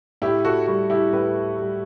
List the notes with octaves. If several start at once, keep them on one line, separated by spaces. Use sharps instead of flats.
A2 E4 G4
F#4 A4
G3 F#4
E4 G4
A2 G4 B4
G3